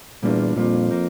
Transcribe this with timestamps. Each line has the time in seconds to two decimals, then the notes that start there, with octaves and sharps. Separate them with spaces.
0.23 E2 A#2 G3 A#3 D4 F4
0.56 F2 A#2 G3 A#3 D4 F4
0.91 F3 A#3